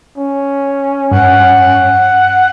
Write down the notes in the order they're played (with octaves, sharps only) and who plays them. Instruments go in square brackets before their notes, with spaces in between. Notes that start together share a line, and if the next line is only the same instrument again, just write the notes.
[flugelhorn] C#4
[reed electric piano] G2 [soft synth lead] F#5